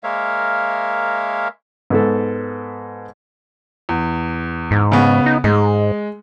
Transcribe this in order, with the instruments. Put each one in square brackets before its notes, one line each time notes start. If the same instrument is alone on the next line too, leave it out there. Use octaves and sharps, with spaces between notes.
[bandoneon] G#3 A#3 A#4 C#5 E5 F5
[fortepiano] G#2 B3 A4
[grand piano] E2
[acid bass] G#2
[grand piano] C#3 B3
[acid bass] D#4
[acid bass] G#2 [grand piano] G#3